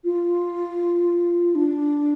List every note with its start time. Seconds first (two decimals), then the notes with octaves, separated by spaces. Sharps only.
0.04 F4
1.55 D4